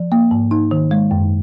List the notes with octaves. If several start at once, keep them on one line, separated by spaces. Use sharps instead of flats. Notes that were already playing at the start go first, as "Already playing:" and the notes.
Already playing: F3
A#3
G#2
D#4
D#3
G#3
F#2